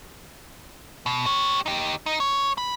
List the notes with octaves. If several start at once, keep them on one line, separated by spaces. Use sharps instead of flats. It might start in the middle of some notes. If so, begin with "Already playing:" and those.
B2
G4 C#5
D#4 G4
D#4
C#5
B5